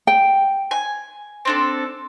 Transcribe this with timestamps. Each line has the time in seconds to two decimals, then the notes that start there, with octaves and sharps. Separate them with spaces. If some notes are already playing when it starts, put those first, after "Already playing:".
0.07 G5
0.71 G#5
1.45 C4 D4 A4